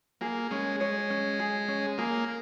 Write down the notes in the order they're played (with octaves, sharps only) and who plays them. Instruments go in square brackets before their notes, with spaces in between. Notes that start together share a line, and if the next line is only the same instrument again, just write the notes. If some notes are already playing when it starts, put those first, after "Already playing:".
[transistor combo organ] A#3 [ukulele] G#4
[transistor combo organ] G#3 [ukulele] C#4
[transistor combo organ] G#3 [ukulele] C#5
[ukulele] C#4
G#4
C#4
[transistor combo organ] A#3 [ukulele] G#4